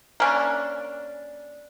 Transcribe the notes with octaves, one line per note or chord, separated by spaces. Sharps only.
A#3 C#4 D4